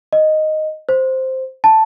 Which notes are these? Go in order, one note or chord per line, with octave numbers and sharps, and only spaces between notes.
D#5
C5
A5